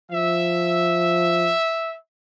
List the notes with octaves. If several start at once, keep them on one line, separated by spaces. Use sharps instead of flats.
F3 E5